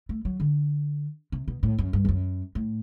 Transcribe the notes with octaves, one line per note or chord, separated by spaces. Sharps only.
A3
F#3
D3
C3
B2
A2
F#2
G2
E2
F#2
A2